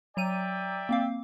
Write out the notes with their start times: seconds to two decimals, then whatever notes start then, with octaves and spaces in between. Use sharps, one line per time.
0.17 F#3 D5 E5 G5 A#5 D#7
0.89 A#3 C4 F5